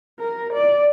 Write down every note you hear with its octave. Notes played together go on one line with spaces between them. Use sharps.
A#4
D5